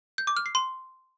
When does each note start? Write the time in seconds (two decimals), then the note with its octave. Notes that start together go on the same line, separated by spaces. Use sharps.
0.18 G6
0.27 D6
0.37 F6
0.46 C7
0.55 C6